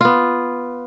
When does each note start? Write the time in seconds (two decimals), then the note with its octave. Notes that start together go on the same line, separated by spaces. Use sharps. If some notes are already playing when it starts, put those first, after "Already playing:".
0.01 B3 F4